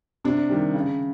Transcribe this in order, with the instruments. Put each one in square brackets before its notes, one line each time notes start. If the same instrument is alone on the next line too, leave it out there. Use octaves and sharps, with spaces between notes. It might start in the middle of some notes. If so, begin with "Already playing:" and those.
[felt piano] C3 D4
D#3 G3
C#3